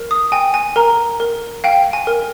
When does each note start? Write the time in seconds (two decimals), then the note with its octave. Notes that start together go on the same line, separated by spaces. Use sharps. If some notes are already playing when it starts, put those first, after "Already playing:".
Already playing: A#4
0.11 D#6
0.32 G5 G#5
0.54 G#5
0.76 A#4 A#5
1.20 A#4
1.64 F5 G5
1.93 G#5
2.07 A#4